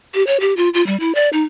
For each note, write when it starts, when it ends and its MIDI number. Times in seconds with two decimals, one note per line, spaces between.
0.14 0.25 67
0.27 0.40 73
0.40 0.53 67
0.57 0.69 65
0.74 0.85 65
0.87 0.96 55
1.00 1.14 64
1.15 1.29 74
1.33 1.43 63